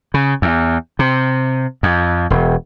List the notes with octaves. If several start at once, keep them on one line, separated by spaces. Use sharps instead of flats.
C#3
E2
C3
F2
E1